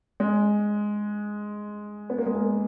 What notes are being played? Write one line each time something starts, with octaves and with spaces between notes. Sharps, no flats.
G#3
B3
A#3
G#3
A#3